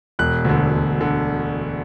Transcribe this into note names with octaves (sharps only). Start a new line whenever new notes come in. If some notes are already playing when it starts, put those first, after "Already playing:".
E1 F#6
D2 D3
E1
D3